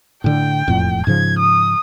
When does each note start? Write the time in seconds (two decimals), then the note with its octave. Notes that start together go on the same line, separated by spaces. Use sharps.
0.24 A2 D3 G5
0.68 E1 F2 A2
1.07 G#2 C#3 F3 G#6
1.39 D#6